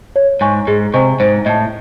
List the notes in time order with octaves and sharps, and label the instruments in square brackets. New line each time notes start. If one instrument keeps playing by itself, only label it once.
[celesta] C#5
[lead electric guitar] G#2 [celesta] G#5 C#6
[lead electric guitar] G#2 [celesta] G#4
[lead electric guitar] C3 [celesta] C5 D#5 G#5 C#6
[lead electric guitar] G#2 [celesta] C5
[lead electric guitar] A2 [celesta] D#5 A5